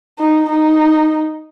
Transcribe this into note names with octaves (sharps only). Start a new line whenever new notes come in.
D#4
D#4